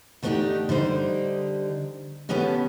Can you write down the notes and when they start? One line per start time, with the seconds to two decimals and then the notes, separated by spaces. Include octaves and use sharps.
0.22 D3 A3 B3 D4 D#4 G4
0.69 D3 G3 D#4 C5
2.29 B2 D3 B3 C#4 G4 A4